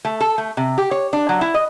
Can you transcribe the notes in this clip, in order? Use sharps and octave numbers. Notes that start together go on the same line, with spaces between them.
A3
A4
A3
C3
G4
C#5
D4
F#3
E4
D#5